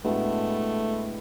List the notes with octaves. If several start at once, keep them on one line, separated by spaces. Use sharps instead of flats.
A2 G#3 A3 B3 D4 F#4